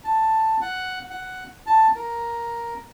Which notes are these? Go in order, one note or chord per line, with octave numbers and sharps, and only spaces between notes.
A5
F#5
F#5
A5
A#4